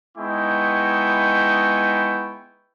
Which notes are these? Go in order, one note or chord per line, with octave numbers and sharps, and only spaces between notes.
G#3 B3 D#4 E4 G5 C#6